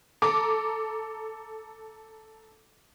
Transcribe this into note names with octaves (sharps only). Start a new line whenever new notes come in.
A4 A#5 D6